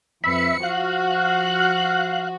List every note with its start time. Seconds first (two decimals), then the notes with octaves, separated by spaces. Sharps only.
0.24 F2 B4 E5 B5 C#7
0.63 F3 F#4 F5 F#6